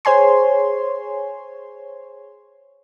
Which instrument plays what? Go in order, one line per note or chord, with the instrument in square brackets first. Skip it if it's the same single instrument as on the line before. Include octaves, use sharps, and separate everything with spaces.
[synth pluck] G#4 C5 C#5 G#5 C6